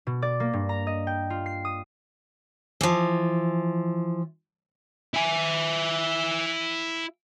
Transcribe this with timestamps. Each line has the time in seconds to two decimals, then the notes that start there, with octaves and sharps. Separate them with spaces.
0.07 B2
0.22 D5
0.40 A#3
0.53 G2
0.69 A#5
0.87 D#5
1.07 G5
1.30 F4
1.46 C7
1.65 D#6
2.81 E3 F3
5.14 E4 G#5